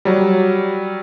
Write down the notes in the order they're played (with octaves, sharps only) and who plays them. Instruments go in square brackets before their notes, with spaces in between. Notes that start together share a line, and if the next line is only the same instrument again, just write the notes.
[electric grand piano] F#3 G3